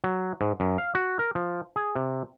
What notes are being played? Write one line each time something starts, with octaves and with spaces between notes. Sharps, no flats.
F#3
G#2
F#2
F5
F#4
A#4
F3
G#4
C3